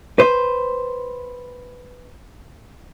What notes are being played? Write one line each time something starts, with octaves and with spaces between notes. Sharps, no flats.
B4 C5